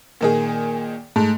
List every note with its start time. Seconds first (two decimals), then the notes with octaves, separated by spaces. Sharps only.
0.21 A#2 D#3 G#4
1.16 G#2 A3